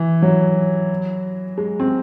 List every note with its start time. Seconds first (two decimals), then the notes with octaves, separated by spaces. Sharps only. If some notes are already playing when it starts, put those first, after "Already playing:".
Already playing: E3
0.22 F#3
1.58 G#3
1.80 C4